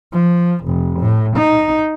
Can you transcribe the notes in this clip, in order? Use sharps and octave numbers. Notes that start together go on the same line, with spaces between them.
F3
F1
A2
D#4